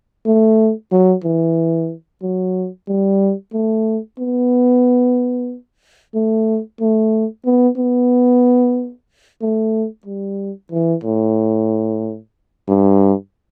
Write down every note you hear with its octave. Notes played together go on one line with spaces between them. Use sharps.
A3
F#3
E3
F#3
G3
A3
B3
A3
A3
B3
B3
A3
G3
E3
A2
G2